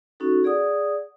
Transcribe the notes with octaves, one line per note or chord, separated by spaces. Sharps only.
C#4 D#4 F#4 A4
G#4 D5 F#5 D#6